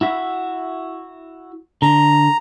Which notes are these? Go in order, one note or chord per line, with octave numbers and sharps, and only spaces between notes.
E4 F#4 E5
D3 A#5